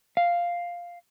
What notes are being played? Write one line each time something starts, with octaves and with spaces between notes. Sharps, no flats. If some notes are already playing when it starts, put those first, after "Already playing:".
F5